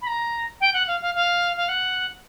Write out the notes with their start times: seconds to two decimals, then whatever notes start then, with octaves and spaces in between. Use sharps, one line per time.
0.02 B5
0.07 A#5
0.61 G5
0.74 F#5
0.87 F5
1.01 F5
1.15 F5
1.57 F5
1.69 F#5